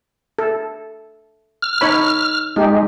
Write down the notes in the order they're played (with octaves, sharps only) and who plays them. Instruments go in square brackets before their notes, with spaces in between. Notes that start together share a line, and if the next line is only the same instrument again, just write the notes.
[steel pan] A4
[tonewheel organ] F6
[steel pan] D#4 C#5 B5
[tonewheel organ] G#3 [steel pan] D#4 G4